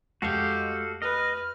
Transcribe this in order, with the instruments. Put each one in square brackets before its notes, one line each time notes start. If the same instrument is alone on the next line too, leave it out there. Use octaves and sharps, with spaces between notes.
[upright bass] F2 A3 [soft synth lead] G#3 [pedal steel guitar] F#4 A4 F5 [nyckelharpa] G4
[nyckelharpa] B4 [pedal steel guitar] D#5 [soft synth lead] F6